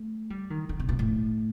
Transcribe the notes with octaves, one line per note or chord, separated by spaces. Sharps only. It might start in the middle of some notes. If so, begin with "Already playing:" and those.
Already playing: A3
G3
D#3
D3
C3
A#2
A2